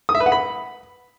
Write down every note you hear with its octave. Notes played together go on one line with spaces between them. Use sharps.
D#6
E5
B4
F#5
B5